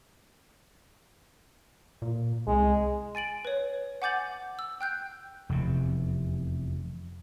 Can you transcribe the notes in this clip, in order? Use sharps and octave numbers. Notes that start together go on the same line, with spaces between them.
A#2
C2 G#3
G#5 A6 D7 F#7
B4 C#5
F#5 G#5 D6 G6 A6 F#7
E6
G5 F#6 G6
F1 E2 C3